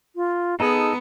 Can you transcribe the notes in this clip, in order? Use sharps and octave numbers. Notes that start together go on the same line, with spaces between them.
F4
B3 D#4 G#4 A4 D#5